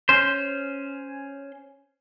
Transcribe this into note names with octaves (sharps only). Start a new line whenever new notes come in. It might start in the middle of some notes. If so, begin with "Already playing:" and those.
C#4 C5